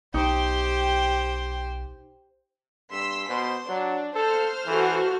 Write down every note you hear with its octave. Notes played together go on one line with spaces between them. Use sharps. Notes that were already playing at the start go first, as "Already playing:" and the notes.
B1 D#4 G4 C5 G5
G2 C6 E6 B6
B2 C5 C6
F#3 D4
A4 C5 F5 F6
E3 F#4 A4